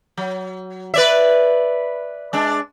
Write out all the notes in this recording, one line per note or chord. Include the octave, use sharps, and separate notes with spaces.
F#3
B4 D5 E5
G#3 D4